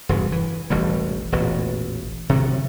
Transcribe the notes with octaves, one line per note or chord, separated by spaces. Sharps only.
E1 G2 C#3
E3
E1 A1 A2 G3
E1 A1 A#2
C3 D#3 F#3